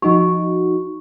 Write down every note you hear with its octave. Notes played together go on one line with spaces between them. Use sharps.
F3 D#4 F#4 C#6